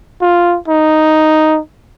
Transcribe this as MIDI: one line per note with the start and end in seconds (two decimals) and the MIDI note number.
0.21 0.57 65
0.68 1.59 63